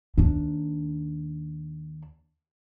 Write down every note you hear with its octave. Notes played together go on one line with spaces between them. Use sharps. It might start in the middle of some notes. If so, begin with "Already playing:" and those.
D#2 D4